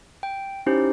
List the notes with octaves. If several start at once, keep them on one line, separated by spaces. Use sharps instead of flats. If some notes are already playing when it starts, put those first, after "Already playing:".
G5
C#4 D#4 E4 G4 C5